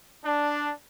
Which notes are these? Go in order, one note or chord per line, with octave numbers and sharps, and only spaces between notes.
D4